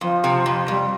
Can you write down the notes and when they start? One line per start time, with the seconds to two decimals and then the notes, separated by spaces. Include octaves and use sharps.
0.01 F2 F3
0.24 C3
0.46 F2
0.68 F2 G3